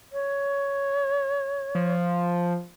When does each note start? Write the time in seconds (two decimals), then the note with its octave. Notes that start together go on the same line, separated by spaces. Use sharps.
0.12 C#5
1.75 F3